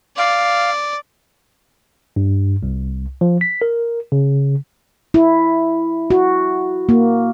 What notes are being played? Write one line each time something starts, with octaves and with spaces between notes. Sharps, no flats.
D5 F5
G2
C2
F3
B6
A#4
C#3
E4
F#4
A#3